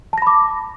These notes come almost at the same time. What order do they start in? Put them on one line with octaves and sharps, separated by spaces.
A5 A#6 B5 D6